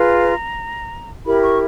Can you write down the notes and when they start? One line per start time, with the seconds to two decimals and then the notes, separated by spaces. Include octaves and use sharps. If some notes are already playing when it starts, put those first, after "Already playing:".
Already playing: F4 G#4 B4 A#5
1.25 E4 G4 A#4 B5
1.43 C#6